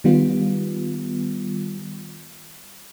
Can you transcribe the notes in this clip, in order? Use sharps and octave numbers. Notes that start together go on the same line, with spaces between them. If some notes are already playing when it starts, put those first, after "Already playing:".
D#3 G3 B3 F4